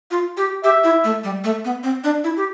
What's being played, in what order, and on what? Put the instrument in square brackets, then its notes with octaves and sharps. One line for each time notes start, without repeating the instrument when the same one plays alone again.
[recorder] F4
G4
[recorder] G4 [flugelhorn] E5
[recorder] E4
A3
G3
A3
B3
C4
D4
E4
G4